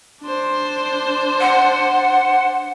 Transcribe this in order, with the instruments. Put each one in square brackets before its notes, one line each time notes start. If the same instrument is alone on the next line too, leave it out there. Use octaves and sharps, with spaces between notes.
[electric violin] D4 C5
[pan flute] F#5